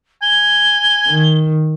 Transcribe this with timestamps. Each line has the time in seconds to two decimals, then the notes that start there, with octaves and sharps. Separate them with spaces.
0.22 G#5 G7
1.08 D#3